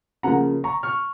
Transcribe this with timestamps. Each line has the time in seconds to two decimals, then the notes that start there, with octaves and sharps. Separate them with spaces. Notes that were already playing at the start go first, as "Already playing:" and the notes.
0.23 C#3 F3 A#3 F#5 A#5
0.64 A#5 C#6
0.83 C#6 F6